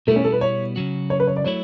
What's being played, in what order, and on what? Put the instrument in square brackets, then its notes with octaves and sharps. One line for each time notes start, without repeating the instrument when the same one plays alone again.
[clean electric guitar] B2 G3 B3 E4 [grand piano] A3
[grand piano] C#4
A4
B4
C#5
[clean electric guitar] C#3 F#3 C#4 F#4
[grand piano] C#5
B4
C#5
D5
[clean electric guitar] F#3 A3 E4 [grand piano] C#5